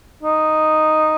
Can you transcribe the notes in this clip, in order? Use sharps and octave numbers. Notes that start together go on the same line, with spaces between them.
D#4